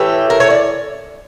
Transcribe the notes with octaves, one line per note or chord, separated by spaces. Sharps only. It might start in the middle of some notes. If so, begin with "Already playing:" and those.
Already playing: A2 E3 A3 G4
A#4
C#5
D5